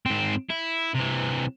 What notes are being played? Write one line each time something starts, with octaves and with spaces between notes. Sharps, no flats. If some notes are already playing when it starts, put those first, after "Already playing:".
G#2 C4
E4
C3 E3